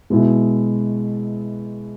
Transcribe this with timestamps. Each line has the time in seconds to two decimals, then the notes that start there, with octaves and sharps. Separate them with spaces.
0.10 B2 G#3 B3 E4